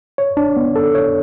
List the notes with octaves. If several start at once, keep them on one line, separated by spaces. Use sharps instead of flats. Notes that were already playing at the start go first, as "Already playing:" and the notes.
C#5
D4
B3
A4
C#5